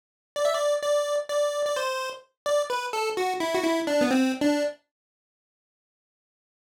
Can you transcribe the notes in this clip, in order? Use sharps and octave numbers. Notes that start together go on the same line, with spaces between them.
D5
E5
D5
D5
D5
D5
C5
D5
B4
A4
F#4
E4
F#4
E4
D4
B3
C4
D4